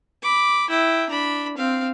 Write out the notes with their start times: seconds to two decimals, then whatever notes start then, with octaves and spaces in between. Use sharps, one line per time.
0.23 B5 D6
0.69 E4 G5
1.09 D4 B5
1.57 C4 F5